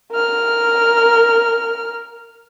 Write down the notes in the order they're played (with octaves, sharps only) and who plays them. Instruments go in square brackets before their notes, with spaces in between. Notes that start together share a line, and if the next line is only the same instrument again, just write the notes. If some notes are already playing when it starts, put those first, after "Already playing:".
[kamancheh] A#4 F6